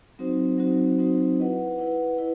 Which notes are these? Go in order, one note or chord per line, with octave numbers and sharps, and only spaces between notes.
F#3 C4 D#4 F#4 C5
F#3 C4 D#4 F#4 C5
F#3 C4 D#4 F#4 C5
E4 B4 D#5 F#5
E4 B4 D#5 F#5
E4 B4